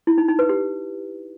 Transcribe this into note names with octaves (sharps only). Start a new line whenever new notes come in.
E4
D#4
D#4
B4
G4